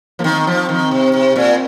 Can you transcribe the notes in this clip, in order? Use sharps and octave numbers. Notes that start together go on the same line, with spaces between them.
F3 A#3
D#3 C4
F3
D#3
C3
C3
A#2